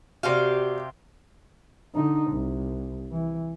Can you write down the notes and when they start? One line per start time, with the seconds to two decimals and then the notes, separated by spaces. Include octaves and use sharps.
0.23 C3 F#4 G4 D5 F5
1.94 D3 D#4
2.31 C2
3.12 E3